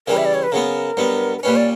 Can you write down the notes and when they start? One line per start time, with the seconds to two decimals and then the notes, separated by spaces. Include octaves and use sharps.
0.08 C#3 E3 G3 A#4
0.17 E5
0.25 D5
0.34 C#5
0.43 B4
0.52 C#3 F#3 B3 A#4
0.97 G2 F#3 B3
1.38 A#4
1.43 A#2 G3 C#4 B4
1.56 D5